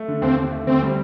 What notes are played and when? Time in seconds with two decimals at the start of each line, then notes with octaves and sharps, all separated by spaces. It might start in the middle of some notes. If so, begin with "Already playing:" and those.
Already playing: A3
0.08 D3
0.22 D#2 C4
0.37 D#2
0.52 A3
0.67 D2 C4
0.82 G3